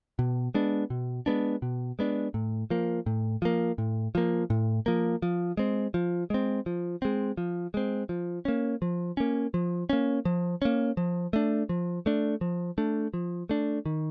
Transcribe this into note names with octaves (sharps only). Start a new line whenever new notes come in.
B2
G#3 B3 D4
B2
G#3 B3 D4
B2
G#3 B3 D4
A2
F3 A#3
A2
F3 A#3
A2
F3 A#3
A2
F3 A#3
F3
G#3 C4
F3
G#3 C4
F3
G#3 C4
F3
G#3 C4
F3
A#3 C#4
F3
A#3 C#4
F3
A#3 C#4
F3
A#3 C#4
F3
A3 D4
F3
A3 D4
F3
A3 D4
F3
A3 D4
D#3